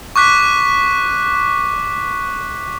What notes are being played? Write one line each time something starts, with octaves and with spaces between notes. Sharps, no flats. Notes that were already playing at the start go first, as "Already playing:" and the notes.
C#6 D6 F#6 B6